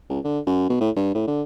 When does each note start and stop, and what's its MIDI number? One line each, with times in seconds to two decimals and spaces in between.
0.10 0.19 37
0.24 0.40 50
0.47 0.69 42
0.69 0.78 47
0.81 0.90 45
0.96 1.12 43
1.15 1.23 45
1.28 1.43 50